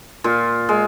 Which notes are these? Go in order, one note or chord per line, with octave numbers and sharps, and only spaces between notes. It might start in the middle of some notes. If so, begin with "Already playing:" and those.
A#2 F4
G#3